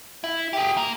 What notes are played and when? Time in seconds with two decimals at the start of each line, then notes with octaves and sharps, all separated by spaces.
0.24 E4
0.53 G4 G#4
0.77 A#3